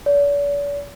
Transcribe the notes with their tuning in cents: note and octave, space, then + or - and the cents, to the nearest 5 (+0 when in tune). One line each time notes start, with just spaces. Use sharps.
D5 -45